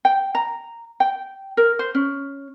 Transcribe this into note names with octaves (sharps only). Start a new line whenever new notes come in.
G5
A#5
G5
A#4
C5
C#4